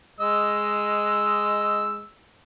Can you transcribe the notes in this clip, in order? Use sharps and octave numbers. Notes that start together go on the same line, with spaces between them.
G#3 D#5 E6